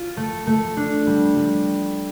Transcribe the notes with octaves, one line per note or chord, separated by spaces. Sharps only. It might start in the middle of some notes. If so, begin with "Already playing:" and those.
Already playing: F4
A3
A3
D4
G3
G3